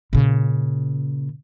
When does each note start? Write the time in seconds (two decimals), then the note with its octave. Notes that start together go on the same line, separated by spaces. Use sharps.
0.13 A#2 C#3